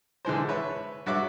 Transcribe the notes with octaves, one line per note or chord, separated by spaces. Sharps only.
D3 E3 G#3 C5
B4 C#5 E5
G2 F#4 C#5 E5 D6